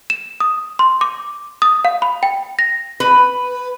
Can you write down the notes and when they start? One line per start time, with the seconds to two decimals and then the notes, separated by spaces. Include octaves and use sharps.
0.10 E7
0.40 D#6
0.79 C6
1.01 D6
1.62 D#6
1.85 F5
2.02 B5
2.23 G5
2.59 A#6
3.00 B4